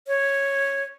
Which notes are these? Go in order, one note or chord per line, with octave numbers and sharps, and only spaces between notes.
C#5